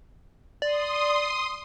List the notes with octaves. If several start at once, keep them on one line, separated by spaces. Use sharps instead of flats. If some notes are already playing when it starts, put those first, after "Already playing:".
D5 C6 D#6